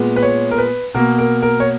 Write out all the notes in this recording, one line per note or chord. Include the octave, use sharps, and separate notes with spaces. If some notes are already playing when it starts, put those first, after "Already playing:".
Already playing: A#2 G#3 B3
B4
C#5
A#4
B4
B2 A#3 A#4
A#4
A#4
C#5